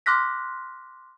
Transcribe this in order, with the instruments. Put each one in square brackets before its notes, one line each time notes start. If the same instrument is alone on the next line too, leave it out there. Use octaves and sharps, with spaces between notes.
[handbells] C6 D6 F6 F#6 A#6 B6